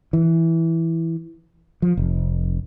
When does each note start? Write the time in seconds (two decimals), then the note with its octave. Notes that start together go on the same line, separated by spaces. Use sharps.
0.13 E3
1.82 F3
1.97 F1